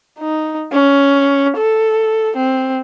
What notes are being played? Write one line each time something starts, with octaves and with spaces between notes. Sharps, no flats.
D#4
C#4
A4
C4